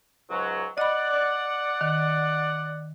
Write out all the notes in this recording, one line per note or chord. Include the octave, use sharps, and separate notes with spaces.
C#2 G#2 F#3
D5 D#5 F#5 B5
D#3